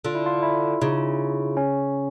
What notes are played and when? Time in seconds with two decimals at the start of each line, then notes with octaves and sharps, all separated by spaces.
0.05 D3 F4
0.15 E4
0.26 F4
0.43 E4
0.82 C#3 D#4
1.57 C#4